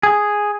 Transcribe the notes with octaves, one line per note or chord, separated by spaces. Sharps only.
G#4